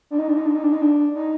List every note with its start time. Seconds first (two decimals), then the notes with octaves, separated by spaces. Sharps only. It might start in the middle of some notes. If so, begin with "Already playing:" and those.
0.11 D4
0.19 D#4
0.28 D4
0.37 D#4
0.46 D4
0.55 D#4
0.64 D4
0.72 D#4
0.82 D4
1.15 D#4